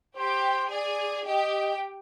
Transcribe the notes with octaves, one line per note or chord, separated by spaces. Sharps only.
G4 C5 G5
G#4 D5 G#5
G4 D#5 G5